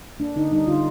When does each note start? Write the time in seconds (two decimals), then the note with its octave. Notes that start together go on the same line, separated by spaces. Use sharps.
0.20 A#3 D4
0.36 D3 D#4
0.51 G3 D#4
0.67 D3 F4